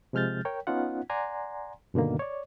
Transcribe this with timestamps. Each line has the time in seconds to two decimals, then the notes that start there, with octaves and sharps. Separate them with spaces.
0.13 C3 F3 G#3 F6 G6 A6
0.45 A#4 C#5 G5
0.67 B3 C#4 D#4 F4 F#5
1.10 D5 F#5 G#5 A#5 C6
1.94 G2 B2 D3 D#3 A#3
2.19 C#5 D5